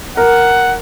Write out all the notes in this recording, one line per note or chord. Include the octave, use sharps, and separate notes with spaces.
A#4 F#5